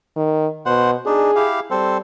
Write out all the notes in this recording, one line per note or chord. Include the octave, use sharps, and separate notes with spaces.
D#3
B2 C5 F#5
D4 D#4 G#4
E4 G4 F5
G3 C4 A4 C5